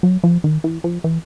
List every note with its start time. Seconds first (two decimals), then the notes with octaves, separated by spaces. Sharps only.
0.03 F#3
0.24 F3
0.44 D#3
0.64 E3
0.84 F3
1.04 E3